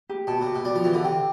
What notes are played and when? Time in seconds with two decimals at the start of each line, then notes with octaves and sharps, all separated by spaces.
0.09 G4
0.27 B2 A5
0.41 C3 G4
0.55 B2
0.65 G3 D5
0.75 F3
0.84 E3 G4
0.94 D3
1.04 C3 G5